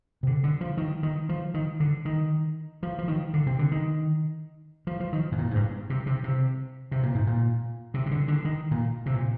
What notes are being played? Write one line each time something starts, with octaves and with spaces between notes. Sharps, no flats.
C3
D3
D3
F3
D#3
D#3
F3
D#3
D3
D#3
F3
F3
D#3
D3
C3
D3
D#3
F3
F3
D#3
G#2
A#2
G#2
G2
C3
C3
C3
C3
A#2
G#2
A#2
C3
C3
D3
D3
D#3
A#2
C3
A#2